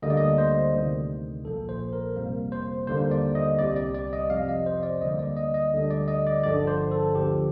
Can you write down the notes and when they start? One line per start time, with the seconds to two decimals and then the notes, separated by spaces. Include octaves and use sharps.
0.02 D2 D3 G3 A#3 D#5
0.10 D5
0.17 D#5
0.38 C5
0.74 D2 C3 D#3
1.45 A#1 A#2 F3 A#3 A4
1.69 C5
1.93 A#4
2.16 G1 F2 C3 G3 A#3
2.52 C5
2.87 D#2 D3 G3 A#3 C5
3.11 D5
3.35 D#5
3.59 C2 C3 G3 D5
3.76 D5
3.94 D5
4.13 D#5
4.30 F2 C3 F3 F5
4.49 D#5
4.66 C5
4.83 D5
5.01 D2 D3 G3 A#3 D#5
5.19 D5
5.36 D#5
5.54 D#5
5.73 D2 D3 G3
5.91 D5
6.08 D#5
6.27 D5
6.43 G1 G2 D3 F3 D5
6.67 C5
6.91 A4
7.15 D2 D3 F3 G4